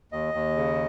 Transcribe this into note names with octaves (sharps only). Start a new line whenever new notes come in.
D#2 D#5
D#2
C#3